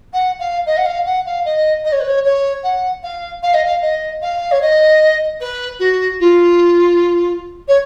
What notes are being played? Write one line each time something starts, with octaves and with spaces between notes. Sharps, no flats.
F#5
F5
D#5
F#5
F5
F#5
F5
D#5
D#5
C#5
B4
C#5
C#5
F#5
F5
F5
D#5
F5
D#5
F5
C#5
D#5
B4
F#4
F4
C#5